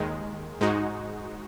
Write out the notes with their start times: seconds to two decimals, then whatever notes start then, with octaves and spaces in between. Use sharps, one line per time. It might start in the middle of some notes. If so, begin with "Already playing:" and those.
Already playing: D#2 D#3 G#3
0.61 G#2 G#3 D#4 F#4